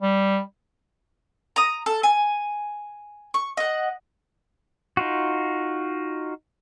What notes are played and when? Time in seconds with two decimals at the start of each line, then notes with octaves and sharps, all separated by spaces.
0.02 G3
1.56 A#5 D#6
1.86 A4
2.03 G#5
3.34 C#6
3.57 D#5 F#5
4.97 D#4 F4 F#4